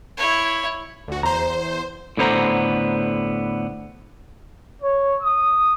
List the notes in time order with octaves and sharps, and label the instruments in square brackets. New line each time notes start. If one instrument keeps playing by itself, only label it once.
[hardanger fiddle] E4 C#5
[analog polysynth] D2 F#4
[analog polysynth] E2 C5 [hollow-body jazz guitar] A#5
[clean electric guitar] A2 D3 B3 C5 A#5
[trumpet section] C#5
D#6